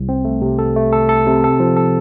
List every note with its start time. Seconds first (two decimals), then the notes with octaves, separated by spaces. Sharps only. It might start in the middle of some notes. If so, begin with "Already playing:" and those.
Already playing: C2
0.09 C4
0.25 A3
0.42 C3
0.59 A4
0.76 A3
0.93 A4
1.09 A4
1.27 C3
1.44 A4
1.60 F3
1.77 A4